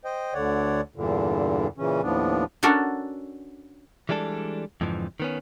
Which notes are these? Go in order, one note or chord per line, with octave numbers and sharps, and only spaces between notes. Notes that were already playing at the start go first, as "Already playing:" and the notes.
C5 D#5 G5
D2 D3 C#5 D5 F#5
E2 G2 A#2 D3
A#2 C#3 E3 C#4
D#2 A2 F3 B3 D4
C#4 D4 F#4 A4 A#4
E3 G3 G#3 D4 A4
F2 G#2 D3 E3 F3
D#3 B3 C#4